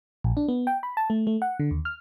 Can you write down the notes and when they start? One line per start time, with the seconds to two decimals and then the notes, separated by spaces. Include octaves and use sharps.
0.24 A#1
0.37 D4
0.48 B3
0.67 G5
0.83 B5
0.97 A5
1.10 A3
1.27 A3
1.42 F#5
1.60 D3
1.71 D#2
1.85 F6